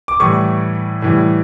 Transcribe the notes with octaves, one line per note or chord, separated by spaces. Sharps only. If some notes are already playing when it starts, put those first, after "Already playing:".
D6
A2 E3 G3 C#6
A2 E3 G3